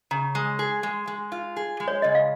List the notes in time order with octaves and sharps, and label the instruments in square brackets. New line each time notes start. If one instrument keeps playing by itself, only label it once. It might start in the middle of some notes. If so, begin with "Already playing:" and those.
[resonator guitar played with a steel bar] C#3 [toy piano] A#5
[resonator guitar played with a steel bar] G#3
G#4
G#3
G#3
F4
G#4
G#3
[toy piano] C#5
[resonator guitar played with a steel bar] C#3 [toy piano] D#5
[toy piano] F5